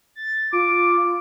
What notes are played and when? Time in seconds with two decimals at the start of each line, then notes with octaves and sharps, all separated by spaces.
0.15 A6
0.53 F4 D6